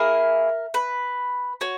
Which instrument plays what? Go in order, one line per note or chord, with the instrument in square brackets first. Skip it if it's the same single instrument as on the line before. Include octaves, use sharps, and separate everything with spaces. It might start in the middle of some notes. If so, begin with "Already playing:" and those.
Already playing: [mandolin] A#3 E4 G#4 A#4
B4
F#4 C#5